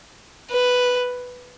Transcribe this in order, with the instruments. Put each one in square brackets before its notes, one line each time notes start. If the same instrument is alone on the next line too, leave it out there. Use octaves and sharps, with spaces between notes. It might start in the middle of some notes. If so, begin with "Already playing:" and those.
[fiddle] B4